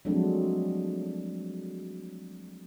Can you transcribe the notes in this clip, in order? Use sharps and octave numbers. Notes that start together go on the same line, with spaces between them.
F3 F#3 G#3 A3 C4 D4